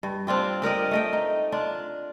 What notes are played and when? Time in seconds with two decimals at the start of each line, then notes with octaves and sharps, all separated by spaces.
0.03 G2
0.27 C4 D4 F4 G4
0.62 G4 A#4 D5 D#5
0.91 A3 D#5 G5
1.13 D#4
1.52 D4 F4